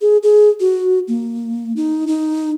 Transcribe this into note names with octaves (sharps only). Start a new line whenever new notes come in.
G#4
G#4
F#4
A#3
D#4
D#4